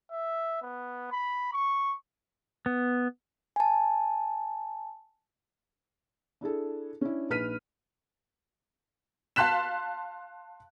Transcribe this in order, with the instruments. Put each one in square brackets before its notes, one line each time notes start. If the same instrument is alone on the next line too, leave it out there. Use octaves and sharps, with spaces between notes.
[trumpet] E5
B3
B5
C#6
[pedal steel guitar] B3
[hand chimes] G#5 A5
[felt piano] D4 E4 G#4 A4
C#4 D4 E4
A#1 D#4 B4 F6 B6 D#7
[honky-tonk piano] F5 A5 C6 F#6 B6 E7